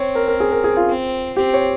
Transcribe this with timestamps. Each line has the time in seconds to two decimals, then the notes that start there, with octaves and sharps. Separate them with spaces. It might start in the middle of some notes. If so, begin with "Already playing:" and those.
Already playing: C4 C#5
0.15 A#4
0.28 A#4
0.40 G#4
0.52 A#4
0.64 G#4
0.77 F4
0.89 C4
1.37 C4 G4
1.54 C#5